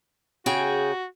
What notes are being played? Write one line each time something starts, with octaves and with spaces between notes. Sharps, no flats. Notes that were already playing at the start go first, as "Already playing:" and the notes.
C#3 F#4 G#4 G5